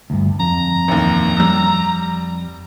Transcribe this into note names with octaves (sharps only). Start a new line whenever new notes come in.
D2 G2
F2 A#5
A1 D#2
G3 E6